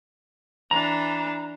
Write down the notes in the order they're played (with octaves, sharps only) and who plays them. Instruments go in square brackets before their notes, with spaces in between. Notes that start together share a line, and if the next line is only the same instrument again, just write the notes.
[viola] E3 D4 [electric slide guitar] A#5